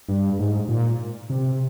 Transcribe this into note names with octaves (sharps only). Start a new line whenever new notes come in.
G2
G#2
A#2
C3